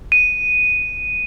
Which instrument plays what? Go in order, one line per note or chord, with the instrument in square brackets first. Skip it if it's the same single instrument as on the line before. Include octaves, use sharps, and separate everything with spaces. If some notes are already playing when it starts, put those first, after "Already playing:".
[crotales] D#7